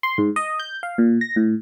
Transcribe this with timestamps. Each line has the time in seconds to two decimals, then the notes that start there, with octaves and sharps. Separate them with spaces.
0.03 C6
0.18 G#2
0.36 D#5
0.60 G6
0.83 F5
0.98 A#2
1.21 A#6
1.36 A2